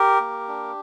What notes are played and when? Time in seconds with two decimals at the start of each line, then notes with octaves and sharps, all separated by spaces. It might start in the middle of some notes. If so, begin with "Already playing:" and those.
Already playing: G4 A#4
0.20 A#3
0.48 D4